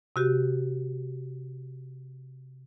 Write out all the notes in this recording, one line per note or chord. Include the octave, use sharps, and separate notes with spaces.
C3 F#4 G4